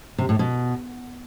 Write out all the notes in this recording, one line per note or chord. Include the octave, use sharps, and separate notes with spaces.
C3
A2
B2